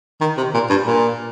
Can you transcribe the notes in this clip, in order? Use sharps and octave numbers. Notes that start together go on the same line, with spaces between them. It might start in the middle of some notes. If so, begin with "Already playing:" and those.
D#3
C3
A#2
G2
A#2